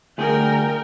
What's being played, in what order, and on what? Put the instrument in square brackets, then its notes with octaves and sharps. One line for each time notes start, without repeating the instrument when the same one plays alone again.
[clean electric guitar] D2 G#4 [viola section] A#4 G5